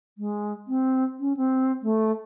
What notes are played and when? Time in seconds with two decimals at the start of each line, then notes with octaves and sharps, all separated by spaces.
0.18 G#3
0.68 C4
1.20 C#4
1.37 C4
1.83 A3